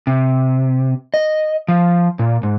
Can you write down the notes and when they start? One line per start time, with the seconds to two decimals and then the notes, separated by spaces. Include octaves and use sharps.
0.07 C3
1.14 D#5
1.68 F3
2.19 A#2
2.43 G#2